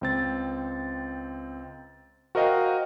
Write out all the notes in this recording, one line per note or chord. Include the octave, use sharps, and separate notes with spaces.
C#2 C4 A6
F#4 A#4 C5 D#5 F5 G5